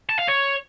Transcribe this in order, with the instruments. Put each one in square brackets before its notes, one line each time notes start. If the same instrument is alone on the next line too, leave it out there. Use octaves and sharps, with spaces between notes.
[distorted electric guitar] A5
F5
C#5